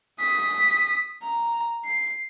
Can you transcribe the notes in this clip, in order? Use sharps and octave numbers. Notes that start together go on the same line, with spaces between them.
D#6 B6
A#5
C7